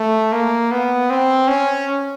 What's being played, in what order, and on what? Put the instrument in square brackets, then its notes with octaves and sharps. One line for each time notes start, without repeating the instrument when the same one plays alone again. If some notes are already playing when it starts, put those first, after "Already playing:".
Already playing: [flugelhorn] A3
A#3
B3
C4
C#4